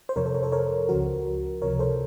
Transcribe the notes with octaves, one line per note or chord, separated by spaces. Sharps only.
C5
F2 C3 F3 A#4 C#5
A4 C5
A#4 C#5
A4 C5
A#4 C#5
C#2 C#3 F3 F#4 A#4
C#2 C3 F3 A#4 C#5
A4 C5